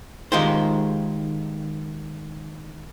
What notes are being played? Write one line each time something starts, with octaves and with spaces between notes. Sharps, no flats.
D#3 G#3 F4 G4 C5